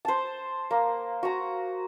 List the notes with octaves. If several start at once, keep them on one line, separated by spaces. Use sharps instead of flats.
C5 A5
A#3
F#4 A#5